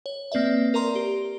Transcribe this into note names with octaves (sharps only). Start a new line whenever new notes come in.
C#5
A#3 C4 B4 D5 E5
A#4 D5 A#5 C6
G4